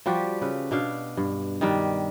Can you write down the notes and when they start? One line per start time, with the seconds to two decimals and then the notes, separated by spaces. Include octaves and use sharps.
0.06 F3 G3 F#4 G4
0.41 C#3 B4
0.71 B2 D4 F5
1.17 G2
1.61 D#3 G3 D4